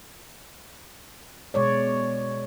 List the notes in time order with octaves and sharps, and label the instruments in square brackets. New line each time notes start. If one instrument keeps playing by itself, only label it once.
[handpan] B2 G#3 C#5 D5